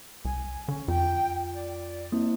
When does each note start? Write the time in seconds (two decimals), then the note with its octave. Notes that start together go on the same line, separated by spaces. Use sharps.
0.25 C2 G#5
0.68 D3 C#4
0.88 F2 F4 G5
1.54 D5
2.12 A#3 C4 E4